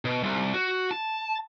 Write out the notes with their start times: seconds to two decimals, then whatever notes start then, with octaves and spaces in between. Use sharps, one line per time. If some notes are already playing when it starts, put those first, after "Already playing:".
0.05 B2
0.23 C2
0.54 F#4
0.91 A5